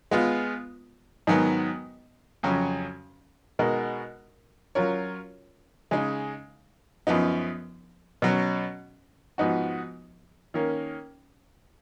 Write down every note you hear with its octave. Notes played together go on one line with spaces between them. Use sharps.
G#3 B3 F4
G#2 D#3 F#3 B3
F2 C#3 F#3 C#4
B2 G#3 D#4 F#4 A#4
F#3 C#4 F4 A#4 C#5
C#3 G#3 D#4
F#2 F3 B3 D#4
B2 F#3 C#4
G#2 F3 B3 D#4 F#4
D#3 A#3 C#4